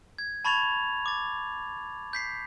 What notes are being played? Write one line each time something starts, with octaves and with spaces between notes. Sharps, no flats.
G#6
A5 B5 C#6 G#6 A6 F7
D6 A6
G6 B6 C7